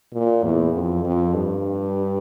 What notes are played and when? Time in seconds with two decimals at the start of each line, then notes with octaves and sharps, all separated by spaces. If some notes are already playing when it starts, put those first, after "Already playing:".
0.13 A#2
0.44 E2
0.74 F2
1.05 F2
1.34 G2